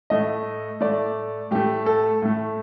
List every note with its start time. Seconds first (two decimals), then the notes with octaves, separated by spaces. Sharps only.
0.10 A2 A3 D#5
0.81 A2 A3 D5
1.51 A2 A3 G4
1.86 A4
2.22 A2 A3